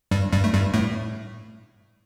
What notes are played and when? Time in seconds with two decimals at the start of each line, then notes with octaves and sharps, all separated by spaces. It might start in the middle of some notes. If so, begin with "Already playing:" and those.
0.11 G2 G3
0.33 G2 G3
0.44 A3
0.53 G2 G3
0.74 A2 A3